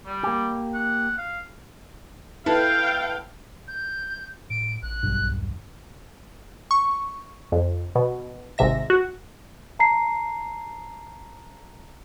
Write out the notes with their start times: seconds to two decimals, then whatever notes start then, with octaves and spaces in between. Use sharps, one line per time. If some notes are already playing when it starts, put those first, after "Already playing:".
0.06 G3
0.23 A#3 G4
0.74 F#5
1.18 F5
2.46 E4 A4 B4 F5 G5
3.68 G6
4.50 A2 D7
4.82 A1 F#6
5.03 B1 G2
5.30 D#2
6.71 C#6
7.52 F2
7.95 B2
8.58 G#1 G#2 C3 E5 A#6
8.90 F#4
9.79 A5 A#5 C7